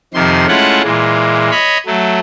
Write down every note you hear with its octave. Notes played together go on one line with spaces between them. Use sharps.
F2 C3 D#3 C6
G#3 A3 C#4 E4 F4 F#5
A#2 E3 G#3
C#5 D#5 B5
F#3 A3